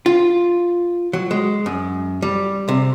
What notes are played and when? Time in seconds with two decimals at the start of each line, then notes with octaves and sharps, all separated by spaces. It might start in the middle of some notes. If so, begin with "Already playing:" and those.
0.06 F4
1.13 F#3
1.31 G#3
1.66 F#2
2.22 G3
2.69 C3